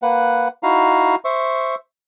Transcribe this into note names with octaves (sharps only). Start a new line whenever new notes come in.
A#3 B4 F#5
D#4 E4 F#4 F5 A#5
C5 E5 C#6